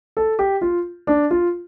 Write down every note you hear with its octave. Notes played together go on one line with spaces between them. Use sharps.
A4
G4
F4
D4
F4